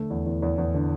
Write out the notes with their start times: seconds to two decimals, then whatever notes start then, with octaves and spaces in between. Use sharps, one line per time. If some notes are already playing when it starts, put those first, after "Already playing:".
Already playing: D3 A3
0.10 E2
0.26 E2
0.42 E2
0.58 E2
0.74 D3